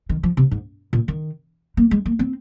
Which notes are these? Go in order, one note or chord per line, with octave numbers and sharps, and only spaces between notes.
D#3
F3
C3
G#2
A#2
D#3
A#3
G#3
A#3
C4